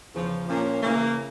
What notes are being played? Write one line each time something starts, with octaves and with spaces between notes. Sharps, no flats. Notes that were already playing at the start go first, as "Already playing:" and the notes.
E2 C#3 F3
A#2 F3 A#3 C#4
C#3 E3 A#3